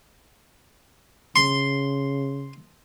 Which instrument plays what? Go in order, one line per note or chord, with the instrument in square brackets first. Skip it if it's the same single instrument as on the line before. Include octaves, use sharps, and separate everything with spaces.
[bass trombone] C#3 [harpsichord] C6